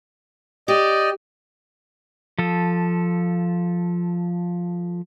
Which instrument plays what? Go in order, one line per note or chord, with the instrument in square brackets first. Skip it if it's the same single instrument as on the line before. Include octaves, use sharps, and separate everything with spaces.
[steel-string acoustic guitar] G4 [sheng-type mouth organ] D5 D#5
[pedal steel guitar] F3 A4